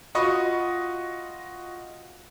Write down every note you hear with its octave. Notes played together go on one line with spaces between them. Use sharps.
F4 F#4 D#5 B5 C#6 D#6